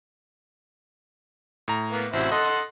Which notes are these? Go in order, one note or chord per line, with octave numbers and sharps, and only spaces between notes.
A2 A#5
A#3 B3
A1 C3 E4 F#4 C5
A4 D#5 F#5 C6